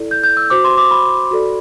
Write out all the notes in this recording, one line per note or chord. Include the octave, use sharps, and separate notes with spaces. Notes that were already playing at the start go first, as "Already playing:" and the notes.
Already playing: E4 A4 D5
G6
G6
E6
F#4 C5 D6
C6
D6
B5
F#4 A4 D5